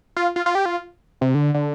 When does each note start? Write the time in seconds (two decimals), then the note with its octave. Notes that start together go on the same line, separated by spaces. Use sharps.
0.16 F4
0.36 F4
0.46 F4
0.55 G4
0.66 F4
1.21 C3
1.35 D3
1.54 D3